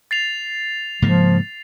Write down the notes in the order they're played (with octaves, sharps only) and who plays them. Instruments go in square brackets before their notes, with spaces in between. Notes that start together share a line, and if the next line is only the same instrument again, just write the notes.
[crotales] A6 C7 F7
[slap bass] G#2 C#3 A#3 [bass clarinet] F3